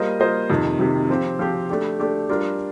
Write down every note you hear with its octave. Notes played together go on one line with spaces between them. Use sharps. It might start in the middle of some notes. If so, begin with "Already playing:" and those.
Already playing: G3 A#3 F4 C5 D#5
G3 A#3 F4 C5 D#5
F2 C3 D#3
F2 C3 D#3
F3 C4 G4
F3 C4 G4
A3 D4 G4
A3 D4 G4
G3 D4 F4 A#4